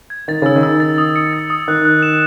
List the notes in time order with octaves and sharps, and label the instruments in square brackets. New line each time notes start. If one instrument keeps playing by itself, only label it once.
[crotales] G#6
[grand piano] D#3 [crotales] A6
[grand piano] C#3 [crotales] E6
[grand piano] D#3
[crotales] E6
A6
D#6
C#7
A6
D#6
[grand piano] D#3 [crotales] F#6
[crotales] F#6
E7